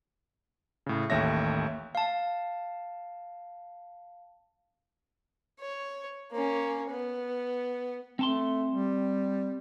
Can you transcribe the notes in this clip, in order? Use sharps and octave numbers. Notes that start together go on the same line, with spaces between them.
A2 C#3
A1 D#2 A3 C#5 E5 A#6
F5 A5
C#5
A#3 C#4
B3
A3 C4 A5 C6
G3